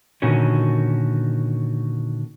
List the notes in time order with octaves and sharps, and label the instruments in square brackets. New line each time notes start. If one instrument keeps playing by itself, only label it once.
[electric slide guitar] A#2 D3 D#3 C#4 F#4